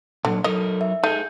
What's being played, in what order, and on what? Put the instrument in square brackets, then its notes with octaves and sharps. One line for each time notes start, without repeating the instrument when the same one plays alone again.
[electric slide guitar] A#2 F#3 [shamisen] D3
[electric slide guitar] F#3 D#4 A#4 [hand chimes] A4 [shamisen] D#5
[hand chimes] E5
[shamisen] A3 [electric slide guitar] D#4 G#4 [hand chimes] G6